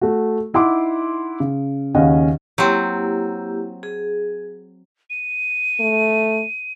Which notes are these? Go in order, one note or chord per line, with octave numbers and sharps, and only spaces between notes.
A3 F#4
D#4 E4 F#5 C6 D6
C#3
D#2 C#3 C#4 D#5 F5 F#5
F#3 A#3 C4 E4 G4
G#4
D#7
A3